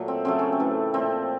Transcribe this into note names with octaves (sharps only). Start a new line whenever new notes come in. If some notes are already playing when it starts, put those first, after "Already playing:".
Already playing: A#2 F#3 A3
C4
C#3 F#3 A3 C4
C#4
C4
A2 E3 A3
A#2 F3 A3 C4